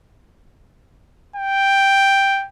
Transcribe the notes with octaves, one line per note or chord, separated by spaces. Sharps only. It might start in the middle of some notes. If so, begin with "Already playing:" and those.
G5